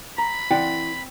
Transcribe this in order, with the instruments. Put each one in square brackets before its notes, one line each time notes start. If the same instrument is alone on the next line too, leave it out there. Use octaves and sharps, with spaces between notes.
[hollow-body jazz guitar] A#5 [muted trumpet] B5
[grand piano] E3 [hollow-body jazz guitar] C4 D5 F#5 [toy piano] G5